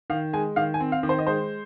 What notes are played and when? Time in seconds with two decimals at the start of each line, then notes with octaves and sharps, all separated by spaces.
0.10 D#3 F5
0.33 G#3 G#5
0.56 D#3 F5
0.74 G#5
0.80 C4
0.92 F5
1.03 D#3
1.09 C5
1.19 D#5
1.27 G#3 C5